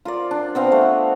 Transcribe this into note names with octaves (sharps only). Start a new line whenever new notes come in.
F4 A#4 D5
D4
B3 C4 F5 F#5
A3